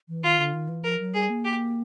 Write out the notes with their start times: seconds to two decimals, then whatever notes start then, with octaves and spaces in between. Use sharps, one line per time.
0.09 E3
0.24 D#3 F4
0.39 D3
0.53 D#3
0.69 E3
0.84 F3 A#4
1.00 F#3
1.14 G3 G#4
1.30 A#3
1.45 G4